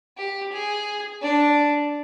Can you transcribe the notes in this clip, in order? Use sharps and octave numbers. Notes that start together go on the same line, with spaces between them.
G4
G#4
D4